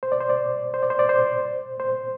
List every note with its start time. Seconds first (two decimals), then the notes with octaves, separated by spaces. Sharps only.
0.03 C5
0.12 D5
0.20 C5
0.29 D5
0.74 C5
0.83 D5
0.90 C5
0.99 D5
1.09 C5
1.80 C5